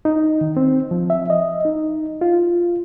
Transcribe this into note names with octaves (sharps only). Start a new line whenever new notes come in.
D#4
D#3
C4
F3
E5
D#5
D#4
F4